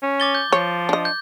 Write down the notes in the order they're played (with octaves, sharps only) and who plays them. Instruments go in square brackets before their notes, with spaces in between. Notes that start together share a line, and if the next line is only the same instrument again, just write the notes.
[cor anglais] C#4
[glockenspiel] D6 A6 G7
G6
[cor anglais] F3 [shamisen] C#5
[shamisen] D4 D#5
[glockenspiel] G6